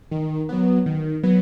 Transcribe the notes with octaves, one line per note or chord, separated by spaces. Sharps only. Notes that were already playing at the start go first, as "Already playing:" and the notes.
D#3
F#3 B3
D#3
F#3 B3